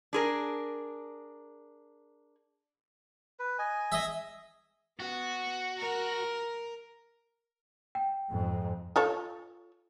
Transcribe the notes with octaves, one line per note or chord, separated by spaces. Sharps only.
D4 G#4 A#4
B4
D#5 G#5
G#4 D#5 E5
B3 F#4
A#4
G5
F2 G#2
F4 A4 C#5